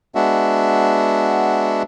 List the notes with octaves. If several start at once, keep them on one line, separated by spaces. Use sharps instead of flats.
G#3 B3 D4 F#4 E5